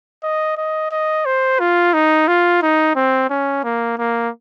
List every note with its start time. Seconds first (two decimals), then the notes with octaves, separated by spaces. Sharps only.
0.23 D#5
0.57 D#5
0.91 D#5
1.25 C5
1.59 F4
1.93 D#4
2.27 F4
2.62 D#4
2.95 C4
3.30 C#4
3.64 A#3
3.98 A#3